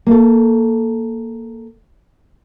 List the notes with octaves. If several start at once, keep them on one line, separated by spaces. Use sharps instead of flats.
A#3 A4